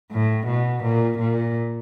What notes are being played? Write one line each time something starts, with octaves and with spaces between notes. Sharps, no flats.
A2
B2
A#2
A#2